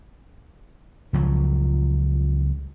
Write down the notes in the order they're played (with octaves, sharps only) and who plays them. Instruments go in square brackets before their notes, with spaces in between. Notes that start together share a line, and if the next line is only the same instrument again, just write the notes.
[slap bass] C#2 F3 F#3